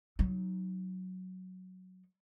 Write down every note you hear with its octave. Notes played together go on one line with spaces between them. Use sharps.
F#3 D#4